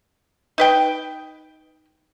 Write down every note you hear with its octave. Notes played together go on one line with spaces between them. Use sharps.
D#4 B4 G5